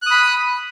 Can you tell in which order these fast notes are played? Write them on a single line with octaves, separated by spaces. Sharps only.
F#6 D#6 B5